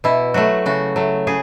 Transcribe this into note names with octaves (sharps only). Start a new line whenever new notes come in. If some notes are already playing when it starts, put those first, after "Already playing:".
B2 E4
F#3 A3 F#4
C#3 F#4
F#3 A3
C#3 G#4